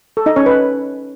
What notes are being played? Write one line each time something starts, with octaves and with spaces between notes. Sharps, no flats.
A4
D#4 D#5
C#4 C#5
B4